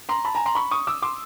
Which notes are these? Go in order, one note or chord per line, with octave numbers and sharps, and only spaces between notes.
A#5 C6
A5 B5
G#5 A#5
A#5 C6
B5 C#6
C#6 D#6
D6 E6
C6 D6